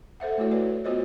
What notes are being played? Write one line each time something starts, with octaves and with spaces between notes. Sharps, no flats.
A4 C5 E5 F#5
A3 E4 F#4 C#5
F#4 B4 D5
B3 F4 F#4 C5 C#5 D#5